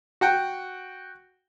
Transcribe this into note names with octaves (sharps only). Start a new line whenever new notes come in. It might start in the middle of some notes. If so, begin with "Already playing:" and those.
F#4 F#5 G5